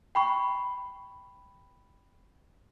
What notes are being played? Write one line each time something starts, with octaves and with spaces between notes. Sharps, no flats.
G5 B5 C#6